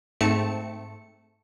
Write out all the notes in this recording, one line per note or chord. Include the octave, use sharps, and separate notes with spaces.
G#2 A3 C4 A5 C#7